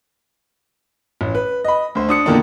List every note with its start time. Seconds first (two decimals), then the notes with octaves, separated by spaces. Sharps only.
1.21 A1
1.35 B4
1.65 D#5 B5
1.95 D2 C5
2.09 D4 D#6 C#7
2.26 E2 A#2 D3 D#3 A#3 D4